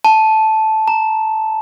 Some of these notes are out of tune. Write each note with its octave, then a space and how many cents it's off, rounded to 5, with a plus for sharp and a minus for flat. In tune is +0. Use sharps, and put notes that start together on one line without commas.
A5 -10
A#5 -15